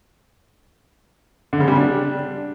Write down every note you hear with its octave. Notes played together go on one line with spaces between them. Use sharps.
D3
C#3
G3
D4